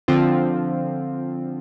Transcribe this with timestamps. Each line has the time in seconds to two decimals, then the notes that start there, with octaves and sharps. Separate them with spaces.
0.08 D3 F3 C4 F4